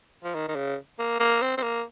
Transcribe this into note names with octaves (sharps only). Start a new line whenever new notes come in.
F3
D#3
D#3
C#3
A#3
A#3
C4
C4
A#3